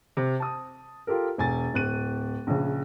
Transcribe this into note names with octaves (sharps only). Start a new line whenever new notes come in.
C3
A5 D#6
F4 G4 A4 A#4
E1 G#5 A6
D1 F#6 D#7
A#1 C#3